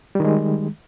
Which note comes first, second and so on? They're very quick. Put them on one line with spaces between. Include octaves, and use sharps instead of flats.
G3 D#3 G#3